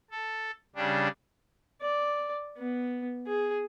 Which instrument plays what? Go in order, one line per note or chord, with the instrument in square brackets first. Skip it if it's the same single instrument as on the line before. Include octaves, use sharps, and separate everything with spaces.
[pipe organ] A4
C#3 G3 D4
[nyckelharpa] D5
B3
G#4